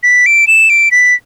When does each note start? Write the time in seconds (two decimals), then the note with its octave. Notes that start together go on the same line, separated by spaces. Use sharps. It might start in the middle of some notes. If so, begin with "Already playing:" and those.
0.03 B6
0.26 D7
0.47 E7
0.70 D7
0.91 B6